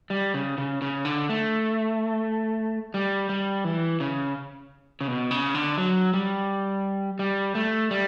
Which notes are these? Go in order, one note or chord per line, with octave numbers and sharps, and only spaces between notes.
G3
C#3
C#3
C#3
D3
A3
G3
G3
E3
C#3
C#3
B2
C#3
D3
F#3
G3
G3
A3
G3